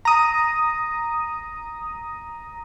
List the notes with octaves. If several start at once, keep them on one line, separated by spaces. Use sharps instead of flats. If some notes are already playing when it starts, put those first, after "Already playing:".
A#5 D#6